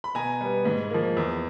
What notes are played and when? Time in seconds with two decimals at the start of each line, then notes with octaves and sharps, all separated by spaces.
0.04 B5
0.15 B2 G#5 A#5
0.41 G3 B3
0.65 G#2
0.90 F3 A#3
1.17 E2